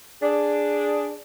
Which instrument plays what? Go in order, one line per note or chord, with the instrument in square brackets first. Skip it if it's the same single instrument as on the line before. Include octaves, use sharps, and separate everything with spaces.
[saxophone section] D4 G#4